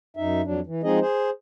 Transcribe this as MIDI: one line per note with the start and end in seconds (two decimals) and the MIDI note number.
0.17 0.41 42
0.17 0.41 63
0.17 0.41 76
0.45 0.60 41
0.45 0.60 54
0.45 0.60 62
0.67 0.81 52
0.83 0.99 53
0.83 0.99 56
0.83 0.99 60
0.83 0.99 63
0.83 0.99 68
0.83 0.99 75
1.01 1.30 68
1.01 1.30 72